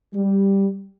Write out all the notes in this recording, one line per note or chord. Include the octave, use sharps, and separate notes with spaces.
G3